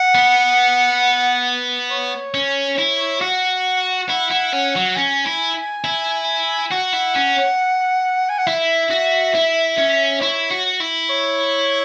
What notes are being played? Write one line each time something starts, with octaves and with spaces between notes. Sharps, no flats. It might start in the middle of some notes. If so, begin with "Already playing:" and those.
Already playing: F#5
B3
C#5
C#4
E4
F#4 F#5
E4
E4
C#4
F#3
C#4 G#5
E4
E4
F#4 F#5
E4
C#4
G#5
F#5
E4 E5
F#4
E4
C#4
E4 C#5
F#4
E4
C#5